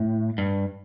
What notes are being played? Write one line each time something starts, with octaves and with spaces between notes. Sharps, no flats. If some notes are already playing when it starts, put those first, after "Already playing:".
Already playing: A2
G2